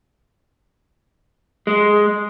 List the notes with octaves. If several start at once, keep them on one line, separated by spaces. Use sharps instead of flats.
G#3